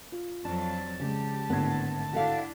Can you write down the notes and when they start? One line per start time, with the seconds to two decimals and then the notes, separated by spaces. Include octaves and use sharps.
0.12 F4
0.45 F2 F#3 D4 A5
1.00 C#3 G#3 G4
1.50 G#1 A2 D3 B3 G#6
2.13 D4 E4 F#4 A4 F5